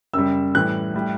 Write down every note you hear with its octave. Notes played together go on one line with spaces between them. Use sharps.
F#2 C#3 G3 E6
A2 E3 G3 F#6
A2 G3